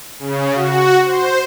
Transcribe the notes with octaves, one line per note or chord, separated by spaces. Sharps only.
C#3
F#4
C5